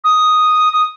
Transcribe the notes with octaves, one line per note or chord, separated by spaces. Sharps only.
D#6
D#6